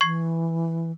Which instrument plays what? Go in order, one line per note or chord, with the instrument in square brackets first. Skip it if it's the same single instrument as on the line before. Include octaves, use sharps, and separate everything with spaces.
[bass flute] E3 [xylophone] C#6 G#6 C7